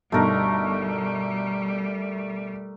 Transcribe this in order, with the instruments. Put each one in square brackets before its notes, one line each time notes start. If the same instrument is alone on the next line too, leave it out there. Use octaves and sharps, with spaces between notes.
[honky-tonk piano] G1 B2 D#4 [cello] G3 [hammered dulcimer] A3 A#4